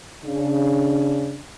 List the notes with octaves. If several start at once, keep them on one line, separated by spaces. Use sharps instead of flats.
C#3 D4